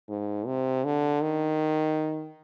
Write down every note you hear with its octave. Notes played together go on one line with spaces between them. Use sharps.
G#2
C3
D3
D#3